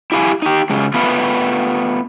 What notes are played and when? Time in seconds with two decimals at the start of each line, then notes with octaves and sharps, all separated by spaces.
0.12 E4 G4 F5 G#5
0.42 D#4 G4
0.70 C#3 F#3 G#3
0.94 A3 B3 F4 B4